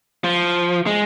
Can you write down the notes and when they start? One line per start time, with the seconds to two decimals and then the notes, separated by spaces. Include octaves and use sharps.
0.24 F3
0.86 G#3